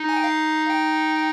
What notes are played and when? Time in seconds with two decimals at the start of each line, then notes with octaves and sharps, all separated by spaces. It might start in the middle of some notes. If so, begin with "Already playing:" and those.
Already playing: D#4
0.09 G#5
0.16 G5
0.24 F5
0.70 G5